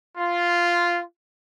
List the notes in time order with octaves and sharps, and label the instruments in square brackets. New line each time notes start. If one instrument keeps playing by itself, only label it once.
[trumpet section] F4